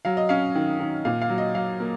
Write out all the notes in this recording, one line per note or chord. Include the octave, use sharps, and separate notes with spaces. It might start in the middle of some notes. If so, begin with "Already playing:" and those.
F#3 F5
D#5
C#4 F5
D#3
D#3
A#2 F5
F5
F#3
D#5
F#3 F5
A#3